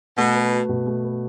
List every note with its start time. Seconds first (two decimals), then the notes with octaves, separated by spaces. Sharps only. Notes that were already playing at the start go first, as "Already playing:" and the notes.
0.18 B2 A3
0.35 B4
0.52 F#4
0.69 B2
0.87 A3
1.04 B4